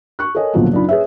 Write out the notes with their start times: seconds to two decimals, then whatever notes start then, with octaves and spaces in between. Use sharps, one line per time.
0.19 C#6 F#6
0.35 A4 A#4 C#5 D#5 G#5
0.54 C#2 A#2 D3 F3 F#3 B3
0.72 F#1 D4 D#4 F4 B5
0.89 G#4 B4 C#5 E5